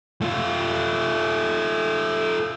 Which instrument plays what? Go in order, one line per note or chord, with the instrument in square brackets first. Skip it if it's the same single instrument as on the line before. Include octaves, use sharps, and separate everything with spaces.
[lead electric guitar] A3 F4